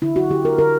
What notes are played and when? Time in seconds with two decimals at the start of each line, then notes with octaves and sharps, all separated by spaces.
0.02 D3 E4
0.16 F#4
0.30 D3 G4
0.45 A#4
0.58 D3 A#4